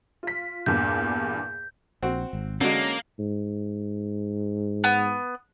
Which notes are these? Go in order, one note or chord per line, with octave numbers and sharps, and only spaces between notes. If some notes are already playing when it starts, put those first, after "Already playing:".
F4 B6
E2 G2 A#2 G6
A#1 C4 F#4
G#1
D3 F#3 G#3 A#3 C#4
G#2
B3